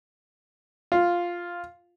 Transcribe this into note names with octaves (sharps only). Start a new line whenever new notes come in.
F4